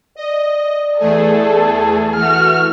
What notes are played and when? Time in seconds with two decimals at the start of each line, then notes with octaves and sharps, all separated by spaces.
0.16 D5 D#5
1.00 E2 A3 G#4 A4
2.15 E3 A3 F#4 F6